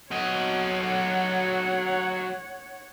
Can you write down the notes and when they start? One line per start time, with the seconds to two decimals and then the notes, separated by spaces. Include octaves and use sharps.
0.11 F#3 C#5 D#5 F#5